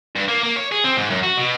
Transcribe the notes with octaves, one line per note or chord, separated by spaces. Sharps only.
G2
A#3
A#3
C#5
G#4
C4
G#2
F#2
F#4
B2